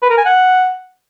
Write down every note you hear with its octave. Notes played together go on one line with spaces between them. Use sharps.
B4
A#4
G#5
F#5